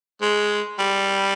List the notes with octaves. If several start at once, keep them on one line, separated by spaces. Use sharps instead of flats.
G#3
G3